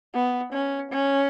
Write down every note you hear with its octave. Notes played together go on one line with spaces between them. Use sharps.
B3
C#4
C#4